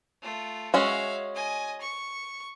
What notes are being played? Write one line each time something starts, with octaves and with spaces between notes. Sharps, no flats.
A3 F4
G#3 C#4 F#4 E5 F5
D#5 G#5
C#6